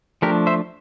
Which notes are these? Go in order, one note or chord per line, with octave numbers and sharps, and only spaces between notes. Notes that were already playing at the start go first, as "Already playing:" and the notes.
F3 A3 D4 G4 A#4
C5 E5